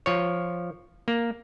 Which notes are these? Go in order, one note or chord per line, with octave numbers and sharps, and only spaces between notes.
F3 C#5
A#3